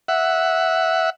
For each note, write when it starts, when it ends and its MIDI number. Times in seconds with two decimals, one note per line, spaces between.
0.08 1.10 76
0.08 1.10 78